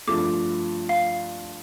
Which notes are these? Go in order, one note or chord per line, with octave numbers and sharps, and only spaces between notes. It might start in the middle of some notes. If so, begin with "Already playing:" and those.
G2 F3 A3 D6
F5